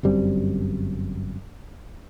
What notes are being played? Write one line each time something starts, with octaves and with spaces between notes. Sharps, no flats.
G1 F#2 G3 C4